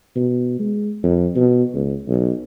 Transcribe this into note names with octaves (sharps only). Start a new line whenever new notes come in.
B2
G#3
F2
B2
C#2
B1